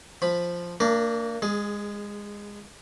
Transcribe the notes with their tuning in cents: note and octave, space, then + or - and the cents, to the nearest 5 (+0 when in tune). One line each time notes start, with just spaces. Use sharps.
F3 +0 B5 +0
A#3 -35 D4 +0 A#4 +0
G#3 -20 G#4 +10